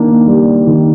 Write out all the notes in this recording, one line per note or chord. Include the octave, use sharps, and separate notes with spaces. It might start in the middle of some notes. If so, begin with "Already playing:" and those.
Already playing: D#3 A#3 D4
G3
D#3